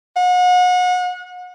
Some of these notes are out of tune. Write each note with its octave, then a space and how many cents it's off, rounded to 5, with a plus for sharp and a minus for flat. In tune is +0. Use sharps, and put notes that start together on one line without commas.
F#5 -35